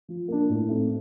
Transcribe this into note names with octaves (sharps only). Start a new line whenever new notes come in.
F3
A#3 D4
A2
A3 C4 D#4